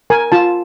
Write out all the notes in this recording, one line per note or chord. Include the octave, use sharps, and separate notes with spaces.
A#4 G#5
F4 A5